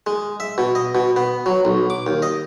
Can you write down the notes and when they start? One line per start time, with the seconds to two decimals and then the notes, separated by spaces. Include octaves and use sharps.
0.07 G#3
0.40 E5
0.58 B2
0.75 D#5
0.95 B2
1.16 B3
1.46 F#3
1.65 B1
1.90 D6
2.07 D#2
2.22 D#5